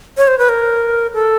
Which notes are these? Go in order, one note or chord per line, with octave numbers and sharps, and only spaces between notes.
C#5
C5
B4
A#4
A4